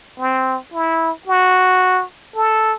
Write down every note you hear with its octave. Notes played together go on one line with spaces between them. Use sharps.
C4
E4
F#4
A4